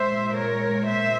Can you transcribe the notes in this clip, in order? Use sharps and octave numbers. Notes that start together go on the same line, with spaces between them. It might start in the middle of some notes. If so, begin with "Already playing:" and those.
Already playing: A#2 G#3 C5 E5
A#4 C#5
C5 E5